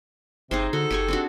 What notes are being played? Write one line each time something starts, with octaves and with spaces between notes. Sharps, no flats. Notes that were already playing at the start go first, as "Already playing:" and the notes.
G1 C3 D#4 G#4 C5
D3 F#4 A4
F#1 G4 G#4 C#6
C4 D4 F#4